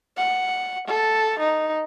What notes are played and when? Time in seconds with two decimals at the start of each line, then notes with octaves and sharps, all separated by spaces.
0.17 F#5
0.87 A4
1.39 D#4